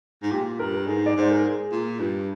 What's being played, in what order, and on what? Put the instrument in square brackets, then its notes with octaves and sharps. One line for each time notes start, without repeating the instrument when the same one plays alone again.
[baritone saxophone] G#2
[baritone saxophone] A#2 [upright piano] G4
[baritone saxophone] G2 [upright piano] A#4
[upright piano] A#4
[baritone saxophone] G#2 [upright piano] G#4
[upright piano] D5
[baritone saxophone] G#2 [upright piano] C5
[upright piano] A#4
G#4
[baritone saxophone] A#2
G2